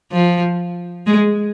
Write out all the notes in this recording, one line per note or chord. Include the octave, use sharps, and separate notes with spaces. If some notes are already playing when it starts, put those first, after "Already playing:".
F3
G#3